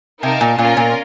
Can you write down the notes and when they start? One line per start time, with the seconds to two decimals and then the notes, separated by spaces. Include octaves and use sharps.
0.22 C3 D#4 A#4 F5 A5
0.41 A#2
0.59 A#2 C#4 F4 A#4
0.77 A#2